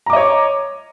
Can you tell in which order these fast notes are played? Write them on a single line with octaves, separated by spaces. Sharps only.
A#5 D6 D#5 C#5